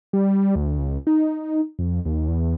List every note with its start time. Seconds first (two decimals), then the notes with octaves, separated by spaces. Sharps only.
0.13 G3
0.56 D2
0.78 C#2
1.07 D#4
1.79 F2
2.05 D#2
2.28 E2